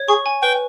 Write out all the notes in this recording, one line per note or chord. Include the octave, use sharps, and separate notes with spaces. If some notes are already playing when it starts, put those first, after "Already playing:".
Already playing: C#5
G#4 C#6
G#5
B4 G5